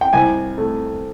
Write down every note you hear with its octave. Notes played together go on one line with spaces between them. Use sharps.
G5
C2 G#5
A3